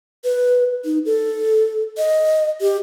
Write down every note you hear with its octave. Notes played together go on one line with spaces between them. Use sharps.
B4
D#4
A4
D#5
G4